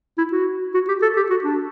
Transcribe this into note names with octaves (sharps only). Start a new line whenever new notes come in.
E4
F#4
F#4
G4
A4
G4
F#4
D4